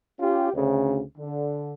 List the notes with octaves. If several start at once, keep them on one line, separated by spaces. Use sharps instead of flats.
C#4 F4 G4
D2 C#3
D3